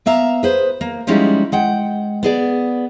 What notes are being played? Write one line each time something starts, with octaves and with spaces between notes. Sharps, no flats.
A#3 B3 E5 F5 A#5
G#4 B4 C5
A#3
F3 G3 G#3 C#4 D#4 E4
G#3 F#5 G5
B3 G#4 D5